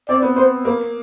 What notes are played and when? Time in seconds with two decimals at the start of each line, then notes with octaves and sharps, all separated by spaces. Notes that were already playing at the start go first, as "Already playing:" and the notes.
0.08 C4 D5
0.22 B3
0.36 B3 C5
0.65 A#3 B4